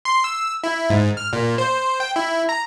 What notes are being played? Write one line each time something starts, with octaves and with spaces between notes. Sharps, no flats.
C6
E6
E4
G#2
F6
A#2
C5
G5
E4
A#5